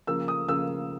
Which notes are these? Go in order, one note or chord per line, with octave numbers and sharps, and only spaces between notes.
C#3 F3 A#3 E6
D#6
C#3 F3 A#3 E6